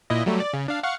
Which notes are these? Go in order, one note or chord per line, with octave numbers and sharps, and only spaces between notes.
A#2 E4 D#5
F#3 G3 A3
D5
C#3
D4 F5
F5 F#5 C#6